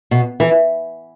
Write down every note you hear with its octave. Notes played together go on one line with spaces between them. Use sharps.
B2
E3